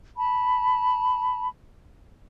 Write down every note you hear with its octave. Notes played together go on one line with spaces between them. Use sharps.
A5 B5